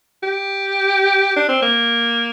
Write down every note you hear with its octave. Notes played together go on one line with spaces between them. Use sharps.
G4
D4
C4
A#3